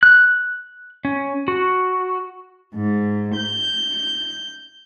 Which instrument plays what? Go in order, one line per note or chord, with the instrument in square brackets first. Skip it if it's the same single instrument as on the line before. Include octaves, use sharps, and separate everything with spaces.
[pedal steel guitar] F#6
C#4
F#4
[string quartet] G#2
G6